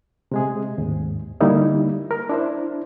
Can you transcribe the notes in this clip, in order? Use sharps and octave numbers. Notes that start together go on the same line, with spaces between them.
C3 G#3 G#4
D#2 G#2
D3 G3 A#3 D#4 E4
A#4
D4 E4 C5